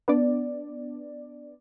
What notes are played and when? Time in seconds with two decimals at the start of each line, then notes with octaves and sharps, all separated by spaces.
0.08 B3 D4 D5